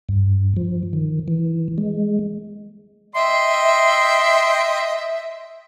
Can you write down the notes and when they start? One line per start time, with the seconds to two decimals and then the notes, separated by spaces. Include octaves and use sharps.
0.09 G2
0.57 F3
0.93 D#3
1.28 E3
1.78 G#3
3.15 D#5 E5 G5 C6